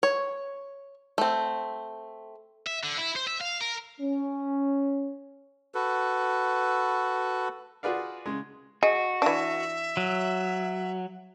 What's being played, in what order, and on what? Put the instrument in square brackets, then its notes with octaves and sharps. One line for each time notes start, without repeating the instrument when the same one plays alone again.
[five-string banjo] C#5
A3 C4
[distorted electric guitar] E5
D3
E4
C5
E5
F5
A#4
[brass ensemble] C#4
[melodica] F#4 A4 B4
[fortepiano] F4 F#4 G#4 B4 D5 F5
C#3 G#3
[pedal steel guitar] F#4 [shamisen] G#4 [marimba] D#5
[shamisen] E3 D4 [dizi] E5
[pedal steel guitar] F#3